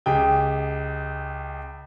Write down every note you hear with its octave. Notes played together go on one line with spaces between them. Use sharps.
C#2 G4 G#4 G5